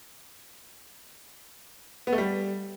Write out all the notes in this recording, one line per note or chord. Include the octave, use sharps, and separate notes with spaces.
B3
A3
G3